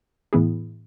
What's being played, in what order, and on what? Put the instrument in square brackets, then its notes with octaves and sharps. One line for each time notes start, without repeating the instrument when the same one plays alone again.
[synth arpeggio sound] A2 E3 B3 E4 G#4